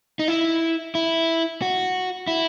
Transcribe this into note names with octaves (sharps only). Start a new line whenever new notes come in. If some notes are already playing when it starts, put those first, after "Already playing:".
D#4
E4
E4
F#4
E4